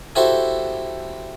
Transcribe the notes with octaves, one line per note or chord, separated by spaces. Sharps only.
E4 F#4 G4 A4 C5 E5